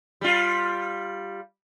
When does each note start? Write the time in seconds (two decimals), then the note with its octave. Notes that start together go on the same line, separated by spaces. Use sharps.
0.21 G3 F4